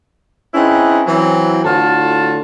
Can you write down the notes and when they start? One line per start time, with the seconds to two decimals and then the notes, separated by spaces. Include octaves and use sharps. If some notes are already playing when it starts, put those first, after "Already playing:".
0.54 C4 C#4 D#4 E4 G#4 B4
1.06 E3 F#3 C4
1.63 A2 D3 F4 F#4 A5